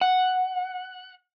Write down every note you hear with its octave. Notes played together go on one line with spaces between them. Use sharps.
F#5